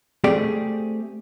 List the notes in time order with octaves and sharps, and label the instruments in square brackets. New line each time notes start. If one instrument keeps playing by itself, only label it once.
[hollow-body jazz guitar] A3 C4 G4 G#4 D5